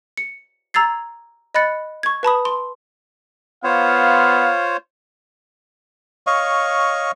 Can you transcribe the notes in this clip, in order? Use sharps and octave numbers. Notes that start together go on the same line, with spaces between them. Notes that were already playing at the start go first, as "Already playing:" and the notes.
C#7
A#5 E6 G#6 A6 C7
D#5 B5 F#6 A6 C#7
C#6 G#6
B4 A5 B5 D#6
C6
B3 F4 C5 C#5 F5
C#5 D#5 F5 C#6